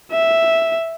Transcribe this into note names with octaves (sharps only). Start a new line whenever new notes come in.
E5